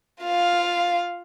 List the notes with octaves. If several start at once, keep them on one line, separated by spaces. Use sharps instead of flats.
F4 F5